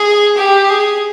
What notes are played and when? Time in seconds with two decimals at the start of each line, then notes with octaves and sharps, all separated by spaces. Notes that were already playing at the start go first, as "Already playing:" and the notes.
Already playing: G#4
0.37 G4
0.69 G#4